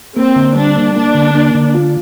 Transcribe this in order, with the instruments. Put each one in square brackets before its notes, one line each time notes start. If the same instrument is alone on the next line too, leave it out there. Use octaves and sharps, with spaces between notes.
[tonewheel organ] A#3 [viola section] C4
[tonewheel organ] D3
[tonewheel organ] G3 [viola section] D4
[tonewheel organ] A#3
[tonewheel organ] A#3 [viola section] D4
[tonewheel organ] D3
A#3
D3
F4